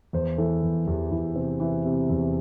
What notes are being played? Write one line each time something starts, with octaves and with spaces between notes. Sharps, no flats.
E2 C5
E3 A4
E2
E2 G4
E2 E4
C3 C4
E3
C3
E2